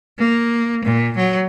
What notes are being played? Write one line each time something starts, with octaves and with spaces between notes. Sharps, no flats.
A#3
A#2
F#3